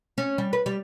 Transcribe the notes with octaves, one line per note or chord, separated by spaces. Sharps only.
C#4
G3
B4
G3